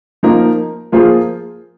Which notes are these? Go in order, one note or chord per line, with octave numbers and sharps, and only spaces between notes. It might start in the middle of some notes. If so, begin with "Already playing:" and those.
F3 A#3 D#4 A#4
F3 A#3 F4 G#4 C5